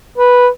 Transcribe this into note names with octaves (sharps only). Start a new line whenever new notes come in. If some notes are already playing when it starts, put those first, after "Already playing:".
B4